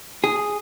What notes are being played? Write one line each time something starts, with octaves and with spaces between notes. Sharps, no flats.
G#4